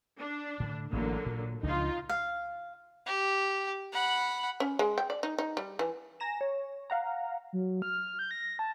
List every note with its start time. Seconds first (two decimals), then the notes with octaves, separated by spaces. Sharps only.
0.18 D4
0.60 A2 D3
0.93 A1 D3 E3 F#3 A#3
1.26 A#2
1.63 C#2 F3 D4 D#4 F4
2.09 F5
3.07 G4
3.92 F#5 B5
4.60 C#4
4.79 G#3
4.98 G5
5.10 D5
5.23 D#4
5.38 D#4
5.57 G3
5.79 E3
6.20 G#5 A#5 A#6 E7
6.41 C#5
6.90 F5 F#5 A#5
7.53 F#3
7.82 F6
8.19 G6
8.31 A#6
8.59 A5